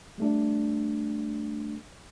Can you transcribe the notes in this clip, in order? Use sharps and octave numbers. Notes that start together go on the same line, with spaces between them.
G3 A3 D4